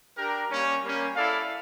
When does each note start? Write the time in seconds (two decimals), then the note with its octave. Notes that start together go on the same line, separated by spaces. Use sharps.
0.17 D4 G4 A#4
0.50 G3 A#3 C#4
0.83 G3 A#3 C#4
1.16 E4 A4 D5 F5